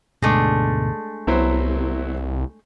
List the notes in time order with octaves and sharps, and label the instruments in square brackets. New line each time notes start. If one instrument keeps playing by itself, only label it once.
[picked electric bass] D2 G#2 B2 [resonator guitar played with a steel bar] G#3 A3 D4
[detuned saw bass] C2 [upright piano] F#3 E4 C5 [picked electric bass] B3